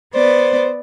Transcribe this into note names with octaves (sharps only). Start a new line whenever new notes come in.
B3 C5 D5